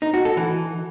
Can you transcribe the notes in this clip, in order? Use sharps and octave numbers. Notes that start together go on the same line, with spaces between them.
D#4
F#4
A4
E3